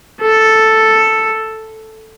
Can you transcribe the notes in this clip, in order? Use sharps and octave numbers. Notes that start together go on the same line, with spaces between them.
A4